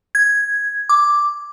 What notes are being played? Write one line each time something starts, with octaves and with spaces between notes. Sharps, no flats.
G#6
D6